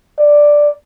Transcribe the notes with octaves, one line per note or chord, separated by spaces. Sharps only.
D5